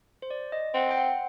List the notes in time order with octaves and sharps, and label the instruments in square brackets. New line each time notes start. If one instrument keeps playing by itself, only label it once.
[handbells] C5
D5
D#5
[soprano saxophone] C4 [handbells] F#5
[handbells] G5
F#5